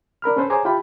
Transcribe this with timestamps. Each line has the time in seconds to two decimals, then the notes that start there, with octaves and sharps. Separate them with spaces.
0.22 D4 A#4 B5 F6
0.36 C#4 A4 B4 C5
0.50 G#4 C5 C#5 G#5 A#5 D6
0.65 E4 F4 G4 G5 A5 B5